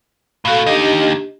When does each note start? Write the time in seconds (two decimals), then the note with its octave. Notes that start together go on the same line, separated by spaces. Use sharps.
0.45 A2 F#4 A4 F5
0.66 D#2 D4 D#4 G4 D#5